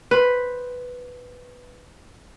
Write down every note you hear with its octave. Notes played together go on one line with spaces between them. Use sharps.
B4 C5